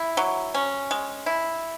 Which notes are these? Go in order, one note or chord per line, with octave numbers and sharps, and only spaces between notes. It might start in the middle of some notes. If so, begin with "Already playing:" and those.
Already playing: E4
F#3
C#4
G#3
E4